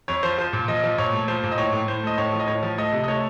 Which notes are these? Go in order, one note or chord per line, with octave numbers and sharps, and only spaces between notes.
F2 C#5
F3 C5
F3 C5
A#2
F3 D#5
F3
A#2 C#5
A3
F3 C5
A#2
D#5
A2 C#5
A2
A2 C5
A3 D#5
A2 C#5
F3
D#5
A2 C#5
F3
A3 D#5
C3
D#5
A3 C#5